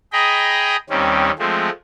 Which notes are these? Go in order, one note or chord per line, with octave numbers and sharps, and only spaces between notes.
G#4 D#5 G5 A#5 B5
D#2 D#3 G3 C4 C#4
F3 G#3 A3 C4